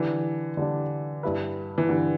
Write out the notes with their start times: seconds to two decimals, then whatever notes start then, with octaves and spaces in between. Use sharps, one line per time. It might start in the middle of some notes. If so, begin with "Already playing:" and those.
Already playing: D3 E3 G3 D4
0.57 D3 G3 D4
1.23 G2 G3 E4 B4
1.78 E3
1.89 G2 D3 G3 E4 B4